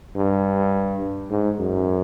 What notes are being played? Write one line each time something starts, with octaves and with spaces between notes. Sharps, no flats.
G2
G#2
F#2